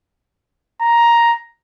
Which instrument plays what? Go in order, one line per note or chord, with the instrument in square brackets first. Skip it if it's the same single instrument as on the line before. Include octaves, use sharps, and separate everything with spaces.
[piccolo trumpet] A#5